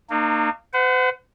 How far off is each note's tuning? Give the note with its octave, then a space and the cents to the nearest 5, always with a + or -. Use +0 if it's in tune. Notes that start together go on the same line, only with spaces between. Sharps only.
A#3 -20 D#4 -45
C5 -45 F#5 +0